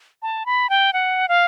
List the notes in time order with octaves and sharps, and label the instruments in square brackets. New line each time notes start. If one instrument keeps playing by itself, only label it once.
[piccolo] A5
B5
G5
F#5
F5